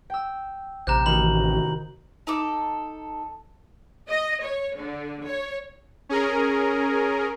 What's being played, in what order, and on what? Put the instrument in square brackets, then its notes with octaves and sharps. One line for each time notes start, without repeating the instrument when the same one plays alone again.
[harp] G5 E6
[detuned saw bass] A1 [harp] C3 [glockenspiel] A#5 F#6 G6
[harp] D#3 [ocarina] F#4 [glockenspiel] B5 F#7
[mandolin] D#4 A4 D6
[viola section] D#5
C#5
D3
C#5
[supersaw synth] C#4 G#4 A#4